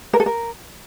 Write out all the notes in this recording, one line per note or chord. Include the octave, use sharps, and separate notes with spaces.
A#4
A4
A#4